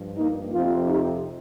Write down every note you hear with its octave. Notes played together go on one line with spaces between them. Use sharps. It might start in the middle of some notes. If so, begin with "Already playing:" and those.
Already playing: G2 F3
A#3 D#4
F2 C3 F3 C4 F4
D#4 G4